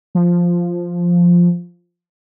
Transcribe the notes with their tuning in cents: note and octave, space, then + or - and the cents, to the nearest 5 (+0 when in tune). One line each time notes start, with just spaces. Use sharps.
F3 +0